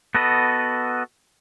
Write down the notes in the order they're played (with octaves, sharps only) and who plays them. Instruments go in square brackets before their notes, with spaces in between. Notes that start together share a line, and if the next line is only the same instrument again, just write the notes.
[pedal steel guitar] B3 F#4 A4 B4 D#5